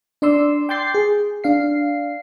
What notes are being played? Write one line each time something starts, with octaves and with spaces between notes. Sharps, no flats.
D4 D5 C6 E6
G5 C6 D6 G6 A6 C7
G#4
D4 F5 C7